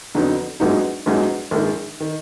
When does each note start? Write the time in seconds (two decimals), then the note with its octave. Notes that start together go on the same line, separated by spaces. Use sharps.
0.15 F2 D3 F#3 B3 D#4
0.60 A#1 G#2 F#3 B3 D#4
1.06 A#1 G#2 F#3 B3 D#4
1.51 A#1 G#2 D#3
2.00 D#3